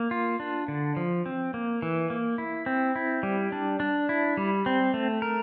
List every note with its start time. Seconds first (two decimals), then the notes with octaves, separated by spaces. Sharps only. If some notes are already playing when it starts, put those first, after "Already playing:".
Already playing: A#3
0.11 F4
0.40 D4
0.68 D3
0.97 F3
1.26 C4
1.54 A#3
1.82 E3
2.10 A#3
2.38 E4
2.66 C4
2.96 E4
3.23 G3
3.52 D4
3.80 D4
4.09 E4
4.37 G3
4.66 C4
4.94 A3
5.22 A#4